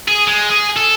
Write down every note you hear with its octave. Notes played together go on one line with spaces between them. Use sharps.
G#4
G#3
G#4
A4